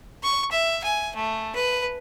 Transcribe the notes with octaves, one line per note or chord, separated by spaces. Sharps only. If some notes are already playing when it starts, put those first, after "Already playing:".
C#6
E5
G#5
A3
B4